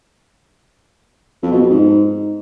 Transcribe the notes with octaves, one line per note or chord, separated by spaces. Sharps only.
F2
B2
F2
G#2